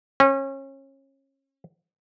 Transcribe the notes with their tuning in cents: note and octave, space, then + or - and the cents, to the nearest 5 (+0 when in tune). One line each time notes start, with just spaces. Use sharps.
C#4 -30